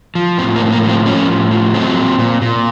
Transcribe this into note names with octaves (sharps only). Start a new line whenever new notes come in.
F3
A2 C4
A#3
A2
A#3
F3
C4
F3 C#4
A2
F3
F#3 C4
A#2
A#2
A#2